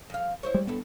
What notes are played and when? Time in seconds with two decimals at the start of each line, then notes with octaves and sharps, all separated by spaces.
0.10 F2 F5
0.43 E4 C5 C#5
0.54 G3 G#3
0.67 G2 B3 E4 A4